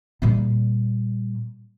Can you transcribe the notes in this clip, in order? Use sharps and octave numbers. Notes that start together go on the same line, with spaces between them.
A#2 G3